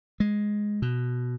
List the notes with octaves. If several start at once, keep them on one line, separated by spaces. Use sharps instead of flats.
G#3
B2